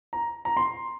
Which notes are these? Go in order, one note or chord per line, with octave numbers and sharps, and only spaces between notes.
A#5
A#5
C6